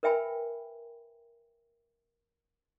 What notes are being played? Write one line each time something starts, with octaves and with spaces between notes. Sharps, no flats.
A#4 B4 E5 G5 G#5 B5